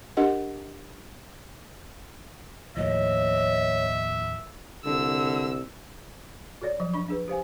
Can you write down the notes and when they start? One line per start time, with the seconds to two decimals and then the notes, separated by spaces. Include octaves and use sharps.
0.17 D4 G4 A#4 D#5 F#5
2.77 D#2 A2 F3 C#5 D#5 E5
4.86 C2 D3 E6
6.62 F#4 A4 C#5 D5
6.80 F3 F#3 D#5
6.93 D4 D#5 B5 C#6
7.08 D4 G#4 B4
7.28 G4 C5 F5 G#5